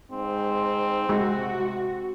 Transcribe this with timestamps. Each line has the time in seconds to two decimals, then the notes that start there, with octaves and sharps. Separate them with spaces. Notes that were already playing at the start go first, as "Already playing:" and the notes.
0.12 G#2 C4
1.09 C3 G#3 F#4